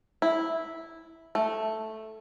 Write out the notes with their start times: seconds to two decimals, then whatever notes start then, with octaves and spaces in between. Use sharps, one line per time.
0.22 E4
1.35 A3